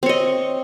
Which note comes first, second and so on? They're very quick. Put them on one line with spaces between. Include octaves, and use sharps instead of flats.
C4 C#5 D#5